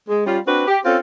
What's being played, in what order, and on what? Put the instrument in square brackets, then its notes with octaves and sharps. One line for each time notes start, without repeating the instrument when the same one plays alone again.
[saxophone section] G#3
G3 C#4 F4
C4 D4 F#4 B4
G4
C4 C#4 F4 A4